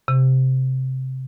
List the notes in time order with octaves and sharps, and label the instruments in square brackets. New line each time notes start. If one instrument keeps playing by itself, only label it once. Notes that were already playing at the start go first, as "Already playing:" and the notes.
[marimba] C3